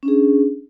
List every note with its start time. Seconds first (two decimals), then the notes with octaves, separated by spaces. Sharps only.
0.03 C#4
0.05 D4
0.08 G#4